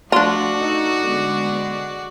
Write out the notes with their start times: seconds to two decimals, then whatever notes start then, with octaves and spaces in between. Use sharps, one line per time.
0.12 F3 A3 D4 F4 F#4 D5
0.57 D#4 A4
1.05 D3 G#3 B3